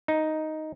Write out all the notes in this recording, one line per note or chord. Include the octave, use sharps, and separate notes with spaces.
D#4